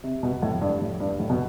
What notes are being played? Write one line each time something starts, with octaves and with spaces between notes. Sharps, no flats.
C3
B2
A2
G2
A2
G2
A2
B2